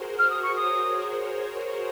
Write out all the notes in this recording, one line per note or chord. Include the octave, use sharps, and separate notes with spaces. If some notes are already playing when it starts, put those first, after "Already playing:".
Already playing: F#4 G#4 A#4 C5
F#4 A#4 F6
D#6
C#6
A#4 C#5 D#6